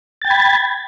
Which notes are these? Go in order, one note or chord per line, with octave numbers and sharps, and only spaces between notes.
G5 B5 G#6 A6